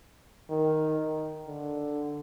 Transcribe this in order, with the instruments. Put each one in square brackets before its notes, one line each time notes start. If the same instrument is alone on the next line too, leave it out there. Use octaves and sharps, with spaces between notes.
[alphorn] D#3
D3